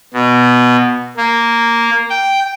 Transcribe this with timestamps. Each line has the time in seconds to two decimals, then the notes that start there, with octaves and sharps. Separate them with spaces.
0.14 B2
1.17 A#3
2.10 G5